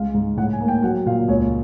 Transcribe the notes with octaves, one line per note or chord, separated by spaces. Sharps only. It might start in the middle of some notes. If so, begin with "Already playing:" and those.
Already playing: C#2 G#3 F5
G#2
A2 F#5
G#5
A#3
G5
F#3 F#5
A#2 F5
C#2 C#5